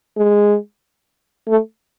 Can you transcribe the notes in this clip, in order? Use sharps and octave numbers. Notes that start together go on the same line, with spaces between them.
G#3
A3